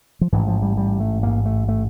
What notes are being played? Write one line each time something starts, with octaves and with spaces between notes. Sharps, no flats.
F3
A1 G#2 E3
F3
G3
G3
A3
A1 G#2 A#3
A3
A3